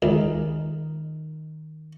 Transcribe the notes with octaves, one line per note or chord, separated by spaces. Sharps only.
C#2 D#3 D#4 A#4